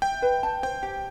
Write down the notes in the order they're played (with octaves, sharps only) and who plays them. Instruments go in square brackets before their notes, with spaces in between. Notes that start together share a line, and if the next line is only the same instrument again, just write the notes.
[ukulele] E5 [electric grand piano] G5
[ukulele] B4
A5
[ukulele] C5 [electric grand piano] G5
[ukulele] G4